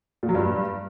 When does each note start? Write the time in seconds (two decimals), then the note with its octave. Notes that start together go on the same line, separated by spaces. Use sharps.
0.23 A#2
0.29 F#3
0.35 G2